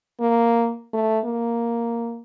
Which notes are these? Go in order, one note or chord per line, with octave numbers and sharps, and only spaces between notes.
A#3
A3
A#3